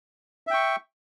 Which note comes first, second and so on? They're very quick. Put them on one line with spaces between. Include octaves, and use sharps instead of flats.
E5 G5 C#6